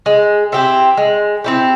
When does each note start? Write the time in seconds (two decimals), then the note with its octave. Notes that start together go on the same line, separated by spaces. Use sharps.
0.06 G#3
0.52 C4 E4 G4
0.97 G#3
1.44 C4 E4 G4